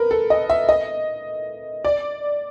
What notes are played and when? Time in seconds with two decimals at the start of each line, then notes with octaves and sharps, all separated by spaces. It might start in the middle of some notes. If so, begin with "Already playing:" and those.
Already playing: A#4 B4
0.11 A4
0.30 D#5
0.50 E5
0.69 D#5
1.85 D5